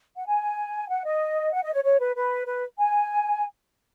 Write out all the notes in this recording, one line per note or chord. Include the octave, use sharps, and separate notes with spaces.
F#5
G#5
F#5
D#5
F#5
D#5
C#5
C#5
B4
B4
B4
G#5